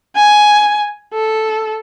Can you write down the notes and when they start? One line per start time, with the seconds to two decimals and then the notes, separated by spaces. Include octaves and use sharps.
0.16 G#5
1.14 A4